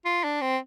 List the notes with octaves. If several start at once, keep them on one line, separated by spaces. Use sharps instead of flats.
F4
D4
C4